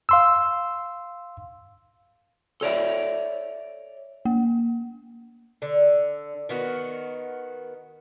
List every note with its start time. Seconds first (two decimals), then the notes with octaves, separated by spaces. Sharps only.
0.09 F5 C6 E6
2.61 A4 C#5 D5 E5
4.25 A#3
5.62 D3
6.49 D#3 B3 F#4